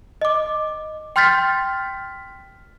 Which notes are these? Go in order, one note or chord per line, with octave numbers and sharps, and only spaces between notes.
D#5 D6
G5 C6 F6 G6 A6 B6